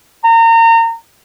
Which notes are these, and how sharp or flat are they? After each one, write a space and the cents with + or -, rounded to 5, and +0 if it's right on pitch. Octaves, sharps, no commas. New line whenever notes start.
A#5 -30